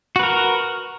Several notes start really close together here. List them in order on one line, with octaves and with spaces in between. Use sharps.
F#4 B4 A#4